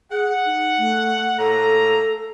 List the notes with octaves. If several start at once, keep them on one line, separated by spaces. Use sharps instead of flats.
G#4 F#5
D#4
A3
A2 A#3 A4 A#5